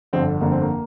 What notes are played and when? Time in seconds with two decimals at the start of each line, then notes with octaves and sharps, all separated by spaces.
0.13 G1 F2 D3 C4
0.41 G1 F2 D3 A#3
0.52 C4
0.62 A#3